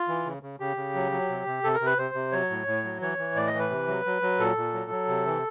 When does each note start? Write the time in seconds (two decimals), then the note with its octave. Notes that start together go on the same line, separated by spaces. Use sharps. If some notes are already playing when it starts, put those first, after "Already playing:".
Already playing: F4
0.08 E3
0.25 C#3
0.43 C#3
0.60 C#3 G4
0.77 C#3
0.95 F#3
1.12 F#3
1.29 C3
1.46 C3
1.64 C3 A4
1.74 A#4
1.80 C3
1.86 B4
1.98 C3 C5
2.15 C3
2.32 F#3 C#5
2.50 A2
2.67 A2
2.84 F#3
3.02 E3 C#5
3.18 E3
3.35 A2 D5
3.47 D#5
3.54 E3
3.59 B4
3.70 C3
3.87 F#3
4.06 F#3
4.22 F#3
4.39 A#2 A4
4.57 A#2
4.74 F#3
4.91 F#3
5.08 C3
5.26 E3